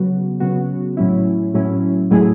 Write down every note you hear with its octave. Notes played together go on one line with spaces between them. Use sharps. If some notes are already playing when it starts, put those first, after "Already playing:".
Already playing: C#3 F#3 B3 F#4
C#3 F#3 B3 F#4
A2 F#3 C#4 E4
A2 F#3 C#4 E4
A2 F#3 A3 E4 G#4